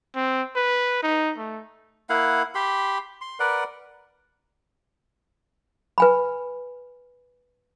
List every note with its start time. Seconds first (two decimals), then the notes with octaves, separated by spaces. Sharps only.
0.15 C4
0.56 B4
1.03 D#4
1.37 A3
2.10 A#3 E4 F5 F#5
2.55 G4 B5 C6
3.21 C6
3.40 A#4 B4 D5 F#5
5.98 B4 G#5 B5